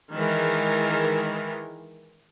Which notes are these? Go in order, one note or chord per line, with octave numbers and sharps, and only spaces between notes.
D#3 E3 G#3 A#4